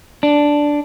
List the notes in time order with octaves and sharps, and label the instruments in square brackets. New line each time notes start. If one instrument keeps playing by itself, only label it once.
[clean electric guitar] D4